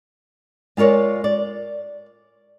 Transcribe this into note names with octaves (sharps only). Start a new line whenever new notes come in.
G#3 F4 A#4 C#5 D5
D5